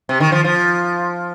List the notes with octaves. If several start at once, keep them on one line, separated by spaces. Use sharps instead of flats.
C3
D#3
F3
F3